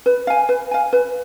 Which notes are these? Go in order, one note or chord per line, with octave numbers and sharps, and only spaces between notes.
B4
F5 G#5
B4
F5 G#5
B4